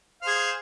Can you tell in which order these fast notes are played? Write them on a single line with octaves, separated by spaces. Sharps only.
F5 C5 G#4